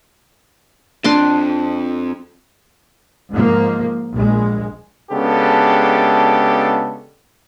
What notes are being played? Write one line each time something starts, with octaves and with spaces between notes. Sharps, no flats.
F2 D4 C6 D6
G#2 F3 A#3
A#1 G#3
C#3 G#3 B3 D4 G4 A4